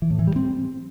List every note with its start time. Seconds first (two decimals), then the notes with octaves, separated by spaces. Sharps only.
0.02 E3
0.10 A2
0.19 E3
0.27 G3
0.36 C4